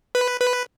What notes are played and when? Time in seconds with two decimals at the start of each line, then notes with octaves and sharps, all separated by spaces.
0.15 B4
0.40 B4